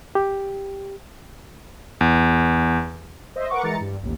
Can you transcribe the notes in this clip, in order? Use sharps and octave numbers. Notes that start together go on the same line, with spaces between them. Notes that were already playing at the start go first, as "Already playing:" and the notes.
G4
E2
C5 D#5 E5
A#4 B4 F#5 C#6 D6
E3 G#3 A#5 A6 C#7
G2
A1 D#2